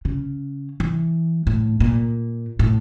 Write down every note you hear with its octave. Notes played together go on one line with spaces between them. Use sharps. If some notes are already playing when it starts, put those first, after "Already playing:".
C#3
E3
A2
A#2
A2